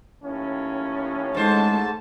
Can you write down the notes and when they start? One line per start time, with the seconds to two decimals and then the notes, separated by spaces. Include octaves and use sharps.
0.24 D#2 A2 C#4
1.35 G#2 G#3 A3 C5 A5